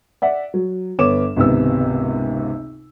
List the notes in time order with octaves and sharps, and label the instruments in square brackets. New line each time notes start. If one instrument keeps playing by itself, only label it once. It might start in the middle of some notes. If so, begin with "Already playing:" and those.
[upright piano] D5 E5 F#5
F#3
G1 B3 C#5 D6 E7
G#1 C#2 C3 B3 E6